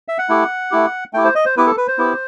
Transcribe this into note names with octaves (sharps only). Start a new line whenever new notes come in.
E5
F#5
A3 E4 G4
A3 E4 G4
A3 E4 G4 G5
C5
D#5
C5
B3 E4 G4 B4
A4
B4
C5
B3 E4 G4